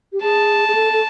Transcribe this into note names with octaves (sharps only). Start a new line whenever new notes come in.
G4
G#4 A5
G#4
A4
A4